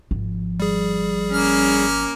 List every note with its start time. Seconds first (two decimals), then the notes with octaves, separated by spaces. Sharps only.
0.11 G#1 F3
0.60 G3 G#4
1.32 A#3 C#4 F6